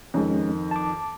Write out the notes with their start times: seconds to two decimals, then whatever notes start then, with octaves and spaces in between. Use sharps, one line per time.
0.14 F2 D#3 G#3 C#4
0.71 A5 D6